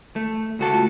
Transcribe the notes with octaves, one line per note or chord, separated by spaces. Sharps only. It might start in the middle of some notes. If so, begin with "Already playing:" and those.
A3
C#2 F#4 A4
A3 F4